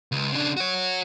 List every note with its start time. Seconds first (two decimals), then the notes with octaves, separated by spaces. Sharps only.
0.12 C#2
0.32 C#3 D4
0.57 F#4 C#5